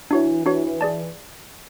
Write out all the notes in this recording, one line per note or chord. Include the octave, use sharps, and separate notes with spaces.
E3 D4 F#4 C#5
E3 D4 F#4 C#5
G#4 D5 A5